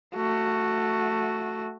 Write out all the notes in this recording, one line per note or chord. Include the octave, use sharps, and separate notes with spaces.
A3 F#4